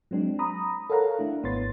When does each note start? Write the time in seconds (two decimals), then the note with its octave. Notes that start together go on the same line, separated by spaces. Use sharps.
0.11 F#3 G#3 C4 D4
0.39 A#5 B5 D#6
0.90 A4 A#4 C#5 F5 F#5 A#5
1.19 A3 D4 E4
1.43 G#1 B3 B4 C#5 C6 A6